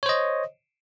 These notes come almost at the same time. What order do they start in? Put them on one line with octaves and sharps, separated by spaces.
C#5 C5 D#5